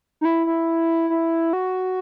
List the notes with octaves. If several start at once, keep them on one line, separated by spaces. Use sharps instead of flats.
D#4
E4
E4
E4
F#4